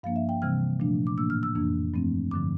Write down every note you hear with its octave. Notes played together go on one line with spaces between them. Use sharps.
G2 F3 A#3 D4 F5
E5
G5
C3 E3 G3 C4 F6
A#2 F3 A3 D4
D6
A2 E3 A#3 D4 E6
F6
E6
F2 E3 A#3 D4
G2 F3 A3 C4
G2 D3 F3 D6